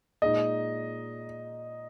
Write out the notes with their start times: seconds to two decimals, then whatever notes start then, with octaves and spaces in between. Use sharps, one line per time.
0.22 A#2 G#3 D#4 D#5